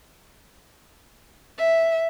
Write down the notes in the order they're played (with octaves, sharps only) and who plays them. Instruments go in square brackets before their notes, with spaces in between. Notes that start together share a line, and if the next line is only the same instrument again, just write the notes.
[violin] E5